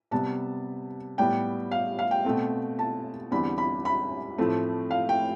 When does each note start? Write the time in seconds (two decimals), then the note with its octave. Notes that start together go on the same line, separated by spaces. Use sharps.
0.11 C3 G3 B3 A5
1.18 A2 G3 B3 G5
1.71 F5
1.99 F5
2.11 G5
2.25 B2 A3 C4
2.79 A5
3.31 E2 D3 G3 C4 B5
3.58 B5
3.85 B5
4.38 A2 F3 A3 C4
4.91 F5
5.09 G5